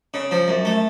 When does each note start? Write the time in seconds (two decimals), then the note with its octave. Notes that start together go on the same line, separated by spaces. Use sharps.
0.14 C#3
0.31 F3
0.48 F#2
0.65 A3